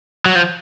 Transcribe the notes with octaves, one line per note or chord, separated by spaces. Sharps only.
F#3
F3